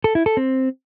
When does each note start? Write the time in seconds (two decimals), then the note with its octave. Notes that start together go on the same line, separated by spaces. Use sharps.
0.04 A4
0.15 E4
0.26 A4
0.37 C4